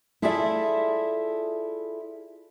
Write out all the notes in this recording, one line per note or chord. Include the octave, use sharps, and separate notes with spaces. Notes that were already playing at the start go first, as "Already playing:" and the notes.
E4 F4 G#4 A4 D5 E5